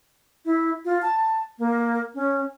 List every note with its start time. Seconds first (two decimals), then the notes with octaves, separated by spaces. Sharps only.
0.45 E4
0.85 F4
1.02 A5
1.59 A#3
2.15 C#4